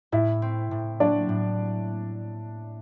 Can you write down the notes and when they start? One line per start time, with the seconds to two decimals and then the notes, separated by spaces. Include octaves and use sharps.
0.12 A2 E4 E5
0.42 C4
0.71 A2
1.00 F#3 D4 D5
1.29 A2